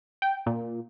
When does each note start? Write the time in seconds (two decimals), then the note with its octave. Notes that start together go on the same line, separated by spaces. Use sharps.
0.22 G5
0.46 A#2